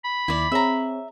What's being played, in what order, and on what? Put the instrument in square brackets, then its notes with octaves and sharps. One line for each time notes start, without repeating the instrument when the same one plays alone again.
[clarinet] B5
[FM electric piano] D#2 [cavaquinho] E4 D5
[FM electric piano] C4 G#4 C#5 [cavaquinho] E5 A#5